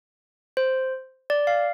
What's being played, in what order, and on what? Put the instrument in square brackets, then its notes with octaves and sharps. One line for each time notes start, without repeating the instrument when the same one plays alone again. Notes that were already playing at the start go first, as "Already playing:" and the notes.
[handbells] C5
D5
F5